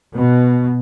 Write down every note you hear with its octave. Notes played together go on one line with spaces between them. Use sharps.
B2